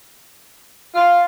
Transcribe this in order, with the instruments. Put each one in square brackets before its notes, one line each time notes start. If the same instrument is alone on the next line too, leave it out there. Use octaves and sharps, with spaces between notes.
[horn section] F4